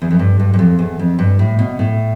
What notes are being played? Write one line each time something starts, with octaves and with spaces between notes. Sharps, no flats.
E2
F2
G2
G2
G2
F2
E2
F2
G2
A2
B2
A2